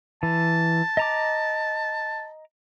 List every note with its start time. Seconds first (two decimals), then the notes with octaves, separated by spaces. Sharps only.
0.23 E3 A5
0.97 D#5 A#5 D6